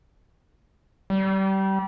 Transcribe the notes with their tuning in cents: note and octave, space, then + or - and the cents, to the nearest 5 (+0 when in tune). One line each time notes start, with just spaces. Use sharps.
G3 -25